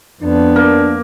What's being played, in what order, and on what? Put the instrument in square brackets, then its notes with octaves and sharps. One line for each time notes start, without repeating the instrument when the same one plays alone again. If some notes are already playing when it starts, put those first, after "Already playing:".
[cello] F2 B3 [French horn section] D4
[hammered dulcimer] A#3